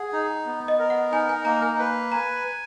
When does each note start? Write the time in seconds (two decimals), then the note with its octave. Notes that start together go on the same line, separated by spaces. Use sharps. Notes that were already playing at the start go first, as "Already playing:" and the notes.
Already playing: G#4 F#5
0.13 D#4
0.46 B3
0.68 D#5
0.79 A#4
0.90 F#5
1.12 D#4 G#5
1.29 G#5
1.45 A#3 A#5
1.62 G#5
1.79 B4
2.12 G#5 A#5